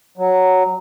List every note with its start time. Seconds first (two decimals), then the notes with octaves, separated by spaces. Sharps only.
0.18 F#3